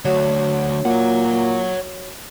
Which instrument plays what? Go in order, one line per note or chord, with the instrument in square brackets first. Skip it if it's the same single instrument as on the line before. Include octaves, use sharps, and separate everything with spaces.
[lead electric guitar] D3 A3 [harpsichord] F#3
[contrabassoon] A#2 [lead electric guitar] C#5 F#5